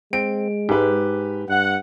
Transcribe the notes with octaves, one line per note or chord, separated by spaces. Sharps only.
G#3 C4 D7
G#2 G4 B4
G2 F#5